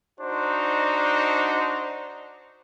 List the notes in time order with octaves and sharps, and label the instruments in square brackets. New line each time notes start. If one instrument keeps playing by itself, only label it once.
[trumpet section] D4 D#4 F#4 C5